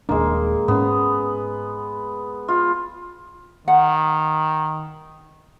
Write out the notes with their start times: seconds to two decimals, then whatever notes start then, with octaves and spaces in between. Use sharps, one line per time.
0.09 D#1 G#1 G#3 A#3 D4
0.68 G#2 B3 C#4
2.48 F4
3.68 D#3 F#5